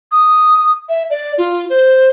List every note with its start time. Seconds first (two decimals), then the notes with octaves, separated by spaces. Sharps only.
0.12 D#6
0.89 E5
1.10 D5
1.38 F4
1.70 C5